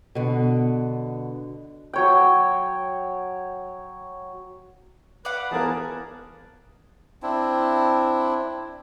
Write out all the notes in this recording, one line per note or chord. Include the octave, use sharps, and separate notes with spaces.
B2 D3
F#3 C#5 G5
B4 D5 F5 F#5
E3 B3 G#4 A#4 A5
C4 D4 E4